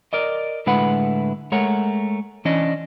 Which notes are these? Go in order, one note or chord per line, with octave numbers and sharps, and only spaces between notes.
A#4 D5 D#5
A2 D3 G#3 E4 B4 F#5
G#3 A3 A#4 C#5 F#5
E3 C#4 D4 D#5